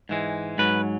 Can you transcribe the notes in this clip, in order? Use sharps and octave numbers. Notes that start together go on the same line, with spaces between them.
G#2 E3 G#3
G#2 F#3 B4